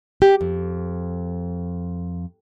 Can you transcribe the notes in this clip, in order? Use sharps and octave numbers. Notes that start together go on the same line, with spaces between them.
G4
F2